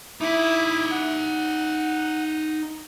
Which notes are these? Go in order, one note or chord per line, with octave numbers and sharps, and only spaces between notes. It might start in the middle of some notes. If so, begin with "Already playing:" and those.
D#4 E4 E5 D6 D#6
F#5